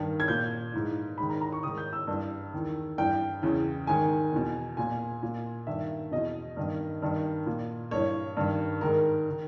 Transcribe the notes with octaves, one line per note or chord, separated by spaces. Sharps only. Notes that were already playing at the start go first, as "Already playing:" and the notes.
Already playing: G2 D#3
G#6
A#2 G6
G#2 E3
G#2 D#3 B5
A#5
A#5
C#6
G#2 D#3 D#6
G6
E6
G2 E3
E2 D#3
G2 E3 G5
E2 C#3 E3
G#2 D#3 G#5
E2 B2
A#2 G#5
A#2
G2 D#3 E5
E2 B2 D#5
G2 D#3
G2 D#3
A#2
G2 E3 C#5
G2 D#3
G#2 D#3 A#4
D#3